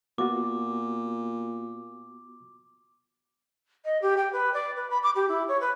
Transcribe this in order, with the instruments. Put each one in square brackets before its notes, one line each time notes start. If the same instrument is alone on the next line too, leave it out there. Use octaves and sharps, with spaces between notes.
[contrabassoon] A#2 [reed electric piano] B3 F4 F#4 [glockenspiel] D6
[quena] D#5
G4
G5
B4
D5
B4
B5
D6
G4
E4
C#5
B4